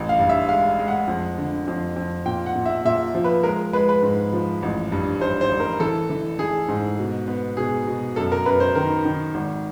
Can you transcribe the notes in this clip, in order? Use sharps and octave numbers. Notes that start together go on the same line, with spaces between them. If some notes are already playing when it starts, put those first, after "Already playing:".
Already playing: A1
F5
G2
E5
G#3 F5
G#3
F#5
F2
D3
F2
F2
A#2 G5
F#5
A#2
E5
A#2 E5
F3
B4
G#3 A#4
G#3 B4
B4
G#2
F3
A1
G2
G2 C5
C5
A1
A#4
E3 A4
E3
E3 G#4
G#2
B2
B3
B2 G#4
B2
F#2 A4
A#4
F#2 B4
C5
D#3 A#4
D#3
G#1